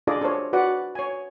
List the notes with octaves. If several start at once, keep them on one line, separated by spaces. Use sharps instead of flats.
D4 F4 G#4 A4 D5 D#5
D4 A4 A#4 C5 C#5
F#4 B4 D5 F#5
C#5 G#5